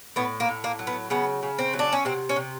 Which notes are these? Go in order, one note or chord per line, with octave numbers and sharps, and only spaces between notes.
A2 B3
A#3
A2
A#3
F#3
B3
C#3 B3
C#3
C4
F#3
D4
C#4
C3 C4
C#4
C3